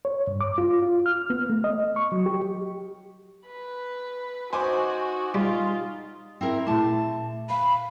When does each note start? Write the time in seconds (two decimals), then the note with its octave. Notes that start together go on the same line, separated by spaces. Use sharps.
0.05 C#5
0.27 G2
0.41 D6
0.58 F4
0.82 F4
1.06 F6
1.30 B3
1.50 A3
1.64 D#5
1.96 C#6
2.12 F#3
2.26 G4
3.47 B4
4.53 D#4 F#4 C5 G#5 D6
5.34 G3 F4
6.41 C4 E4 A#4
6.67 A#2 A3 E4 A5
7.50 F5 B5